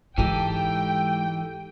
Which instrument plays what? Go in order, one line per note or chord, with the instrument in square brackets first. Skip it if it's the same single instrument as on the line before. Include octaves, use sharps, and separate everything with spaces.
[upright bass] G#2 G#3 [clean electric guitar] E3 D#4 [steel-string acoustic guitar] G4 A4 [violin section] G5